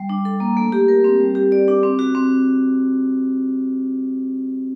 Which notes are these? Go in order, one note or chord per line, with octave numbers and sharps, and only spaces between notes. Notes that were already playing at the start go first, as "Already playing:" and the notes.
Already playing: G3
D4
A4
A#3
A3
G4
A#4
C4
G3
G4
D5
D4
C4
F#4
C4